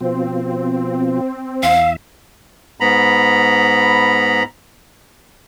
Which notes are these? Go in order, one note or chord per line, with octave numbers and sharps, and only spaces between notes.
B2 F3 C4
E2 E5 F5
G#2 B3 A#5 B5